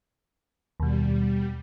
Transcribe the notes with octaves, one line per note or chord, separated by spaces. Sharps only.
D#2 B2 G3